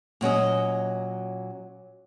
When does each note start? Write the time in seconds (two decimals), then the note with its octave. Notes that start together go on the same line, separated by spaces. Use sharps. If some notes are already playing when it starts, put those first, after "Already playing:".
0.21 A#2 F#3 C#4 D#5